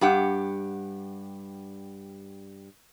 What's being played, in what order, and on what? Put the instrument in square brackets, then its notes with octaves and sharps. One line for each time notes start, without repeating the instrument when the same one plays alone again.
[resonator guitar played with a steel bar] G2 G4 F#5